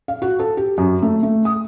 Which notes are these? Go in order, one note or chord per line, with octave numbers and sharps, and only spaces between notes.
F5
F#4
A4
G4
F#2
A3
A3
D#6